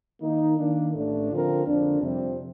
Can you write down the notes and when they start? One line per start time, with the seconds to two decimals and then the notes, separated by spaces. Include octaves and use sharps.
0.21 D#3 A#3 D#4
0.57 D#3 A#3 D4
0.93 A1 A2 A3 D4
1.29 D3 F3 C4 F4 A#4
1.64 F2 D3 F3 A#3 D4
2.01 F2 C3 G3 C4